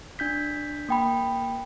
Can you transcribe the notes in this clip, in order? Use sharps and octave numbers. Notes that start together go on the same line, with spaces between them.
D4 G6 B6
A#3 G5 B5